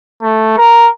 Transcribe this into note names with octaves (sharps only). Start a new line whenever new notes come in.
A3
A#4